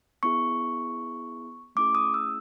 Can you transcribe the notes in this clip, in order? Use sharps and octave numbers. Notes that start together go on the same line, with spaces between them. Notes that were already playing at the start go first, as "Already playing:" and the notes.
B3 E4 G#4 C#6
A3 C#4 E4 G#4 D6
D#6
E6